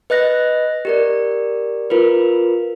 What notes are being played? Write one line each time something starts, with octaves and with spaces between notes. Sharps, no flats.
B4 D#5 F#6 A#6
G4 A#4 D5
F4 A#4 B4